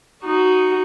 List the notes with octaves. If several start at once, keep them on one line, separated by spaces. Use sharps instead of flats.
D#4 F#4